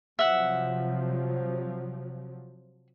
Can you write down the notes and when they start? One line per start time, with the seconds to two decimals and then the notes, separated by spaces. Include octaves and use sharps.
0.19 C3 F3 F#3 E5 F#5